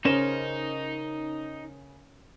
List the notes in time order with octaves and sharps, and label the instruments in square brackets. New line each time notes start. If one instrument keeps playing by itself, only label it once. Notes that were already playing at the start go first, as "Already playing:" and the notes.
[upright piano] C#3 E7 [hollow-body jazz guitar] C#4 A#4 C5 [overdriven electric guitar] D#4